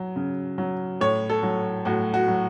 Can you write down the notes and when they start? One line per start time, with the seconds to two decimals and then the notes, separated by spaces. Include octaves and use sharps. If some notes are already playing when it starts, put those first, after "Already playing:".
Already playing: F#3
0.16 C#3
0.58 F#3
1.01 A2 C#5
1.30 A4
1.43 F#3
1.85 A2 F#4
2.14 F#4
2.28 F#3